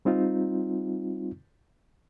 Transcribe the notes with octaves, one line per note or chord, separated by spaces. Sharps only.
G3 C4 D#4 F4